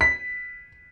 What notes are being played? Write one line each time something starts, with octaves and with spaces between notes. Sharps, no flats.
B6